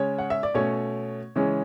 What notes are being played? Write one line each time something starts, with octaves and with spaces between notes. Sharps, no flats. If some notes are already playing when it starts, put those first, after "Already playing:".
Already playing: C#3 G#3 C#4 C#5
F#5
E5
D5
B2 A3 C#4 C#5
C#3 E3 G#3 C#4